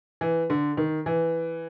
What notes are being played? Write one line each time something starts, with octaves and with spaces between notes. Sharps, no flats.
E3
D3
D#3
E3